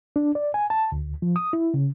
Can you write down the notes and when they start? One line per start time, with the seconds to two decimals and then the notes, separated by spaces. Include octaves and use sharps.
0.16 D4
0.35 D5
0.54 G#5
0.70 A5
0.92 D2
1.22 F3
1.36 D#6
1.53 E4
1.74 C#3